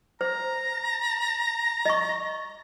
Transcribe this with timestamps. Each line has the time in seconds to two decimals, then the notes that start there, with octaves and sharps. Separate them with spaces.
0.21 C5 A#5
1.85 D#5 C#6